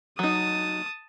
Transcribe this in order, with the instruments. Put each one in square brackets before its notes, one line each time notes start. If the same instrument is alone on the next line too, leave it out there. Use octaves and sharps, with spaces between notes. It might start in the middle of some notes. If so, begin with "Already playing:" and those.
[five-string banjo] F#3 D#4 [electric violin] A5 D#6